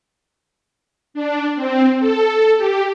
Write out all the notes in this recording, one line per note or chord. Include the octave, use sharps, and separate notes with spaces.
D4
C4
A4
G4